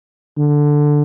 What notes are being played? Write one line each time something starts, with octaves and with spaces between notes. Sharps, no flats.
D3